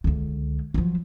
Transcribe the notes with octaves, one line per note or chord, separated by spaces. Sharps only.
C#2 D3
F3 F#3